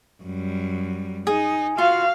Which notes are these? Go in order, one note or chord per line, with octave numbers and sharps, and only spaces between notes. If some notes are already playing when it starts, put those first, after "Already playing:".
F#2 G3
D#4 G#4
F4 F#4 F5